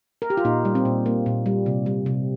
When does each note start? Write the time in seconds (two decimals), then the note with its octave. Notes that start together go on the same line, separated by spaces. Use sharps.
0.22 A#4
0.30 G4
0.37 F4
0.45 A#2 D#4
0.65 G3
0.75 C4
0.85 A#2
1.06 A#3
1.26 A#2
1.46 G3
1.66 C3
1.86 G3
2.06 C3